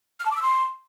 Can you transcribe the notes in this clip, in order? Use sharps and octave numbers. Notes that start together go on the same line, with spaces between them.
F6
A5
D6
E6
C6